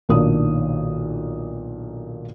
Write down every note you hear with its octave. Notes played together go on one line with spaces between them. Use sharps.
B1 A#2 D#3 A#3 D4 D#6